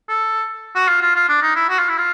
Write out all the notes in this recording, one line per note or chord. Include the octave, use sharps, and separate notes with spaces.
A4
F#4
F4
F4
F4
D4
D#4
E4
F#4
F4
E4
F4